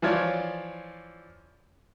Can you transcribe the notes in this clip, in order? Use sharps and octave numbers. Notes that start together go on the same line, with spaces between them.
E3 F3 F4 C#5 D5